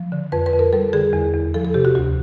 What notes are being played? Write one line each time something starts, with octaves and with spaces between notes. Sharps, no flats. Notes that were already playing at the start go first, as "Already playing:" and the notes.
Already playing: F3
D3
F2 B4
B4
F2
A#4
G3 A4
D3 G#4
E2
E2
F3 A4
A4
C3 G4
F#4
D2 F#4